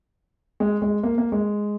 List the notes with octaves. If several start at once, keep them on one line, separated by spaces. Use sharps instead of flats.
G#3
G#3
A#3
A#3
G#3